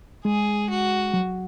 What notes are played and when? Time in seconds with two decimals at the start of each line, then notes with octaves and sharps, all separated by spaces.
0.25 G#3 G#4
0.70 F#4
1.14 F#3